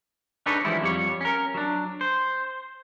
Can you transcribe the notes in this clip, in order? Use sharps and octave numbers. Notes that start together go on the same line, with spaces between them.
D4 D#4 G#4 A4 B4 C#5
E3 F3 G3 G#3 E4
F2 G3 C#5
C#4 A#4
F#3 D4
C5